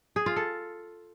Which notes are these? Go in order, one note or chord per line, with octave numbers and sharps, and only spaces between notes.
G#4
F4
A4